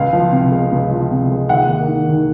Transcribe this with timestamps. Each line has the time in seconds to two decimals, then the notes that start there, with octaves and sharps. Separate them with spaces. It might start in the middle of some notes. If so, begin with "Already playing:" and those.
Already playing: C#2 F5
0.13 F3
0.32 C3
0.51 G#3
0.72 C#2
0.91 F3
1.11 C3
1.30 G#3
1.49 D#2 F#5
1.68 A#3
1.88 D#3
2.08 D#2